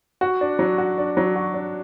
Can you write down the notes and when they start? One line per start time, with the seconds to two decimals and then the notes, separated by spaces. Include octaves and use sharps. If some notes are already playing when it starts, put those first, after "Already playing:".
0.21 F#4
0.41 D4
0.59 F#3
0.78 F#4
0.98 D4
1.17 F#3
1.36 F#4
1.54 D4